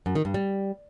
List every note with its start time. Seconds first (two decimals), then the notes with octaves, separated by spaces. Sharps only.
0.06 F#2
0.15 D#3
0.25 G2
0.34 G3